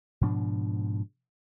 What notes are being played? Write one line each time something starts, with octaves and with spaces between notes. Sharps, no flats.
G#2 B2 F3 D4